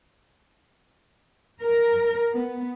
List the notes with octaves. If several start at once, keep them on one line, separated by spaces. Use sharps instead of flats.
A#4
B3